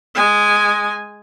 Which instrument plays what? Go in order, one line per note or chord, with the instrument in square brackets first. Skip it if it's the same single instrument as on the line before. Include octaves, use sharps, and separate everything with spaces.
[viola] G#3 G#5